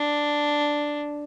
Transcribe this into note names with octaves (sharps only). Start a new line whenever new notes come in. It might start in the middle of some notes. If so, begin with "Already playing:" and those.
Already playing: D4